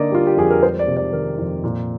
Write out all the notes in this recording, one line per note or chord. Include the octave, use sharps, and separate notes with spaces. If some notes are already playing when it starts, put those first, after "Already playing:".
Already playing: D3 A#3 D5 D#5
G3 F4
G4
F2 G#4
A#4
G#3 C5
D5
C3
D5
D#3 A#4
F2
A#2